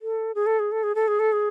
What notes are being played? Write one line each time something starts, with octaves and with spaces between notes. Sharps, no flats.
A4
G#4
A4
G#4
A4
G#4
A4
G#4
A4
G#4